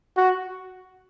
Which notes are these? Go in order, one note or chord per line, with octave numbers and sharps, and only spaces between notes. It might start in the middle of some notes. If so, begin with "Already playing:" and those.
F#4